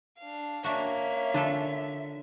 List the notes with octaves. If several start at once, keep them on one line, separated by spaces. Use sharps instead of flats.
D4 F5
A#3 C#4 D4 F#4 E5
D3 D4 F4 A4